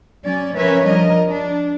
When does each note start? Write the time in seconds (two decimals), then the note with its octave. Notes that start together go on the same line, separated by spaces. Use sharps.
0.23 F#3 C#4 D5
0.56 F3 C#4 A#4 B4 C#5 E5
0.85 F3 G3 D4 A#4 D#5
1.25 D4